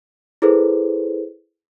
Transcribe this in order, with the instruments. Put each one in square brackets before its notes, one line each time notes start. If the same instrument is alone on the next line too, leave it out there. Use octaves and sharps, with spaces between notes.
[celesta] E4 G#4 A4 B4 C5